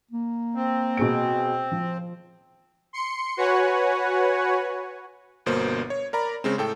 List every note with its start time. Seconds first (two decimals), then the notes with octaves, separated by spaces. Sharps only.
0.11 A#3
0.55 C4
0.97 B2 G#4 D7
1.72 F3
2.93 C6 C#7
3.37 F#4 B4 C#5 F#5 G#5
5.46 G1 B2 A#3 C5
5.90 C#5
6.13 A#4 D5 A#5 B5
6.44 C#3 G#3 C4
6.58 A2 A4 G5